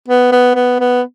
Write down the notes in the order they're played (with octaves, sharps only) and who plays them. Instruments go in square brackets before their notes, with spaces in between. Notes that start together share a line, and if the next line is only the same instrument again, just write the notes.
[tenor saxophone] B3
B3
B3
B3